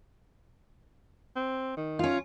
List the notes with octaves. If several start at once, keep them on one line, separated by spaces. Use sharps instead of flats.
C4
D#3
C#4 F4